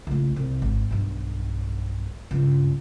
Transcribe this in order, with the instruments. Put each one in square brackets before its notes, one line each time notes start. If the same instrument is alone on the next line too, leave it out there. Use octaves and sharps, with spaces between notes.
[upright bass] C#2 A2
C2
G#1
B1 G2
C#2 G2